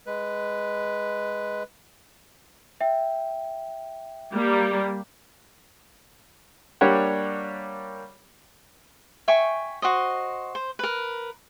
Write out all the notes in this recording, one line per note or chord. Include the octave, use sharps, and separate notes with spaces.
G#3 B4
E5 G5
G3 A#3
G3 A#3 D4 G4 C#5 F#5
E5 G5 G#5 C#6
F#4 C5 D#5
C5
A#4 B4